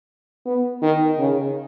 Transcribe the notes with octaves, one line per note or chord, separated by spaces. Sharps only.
B3
D#3
C#3